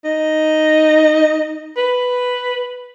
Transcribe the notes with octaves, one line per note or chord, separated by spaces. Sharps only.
D#4
B4